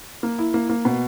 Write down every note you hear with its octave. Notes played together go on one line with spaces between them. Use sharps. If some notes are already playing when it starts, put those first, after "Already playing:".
A#3
E4
A#3
A#3
B2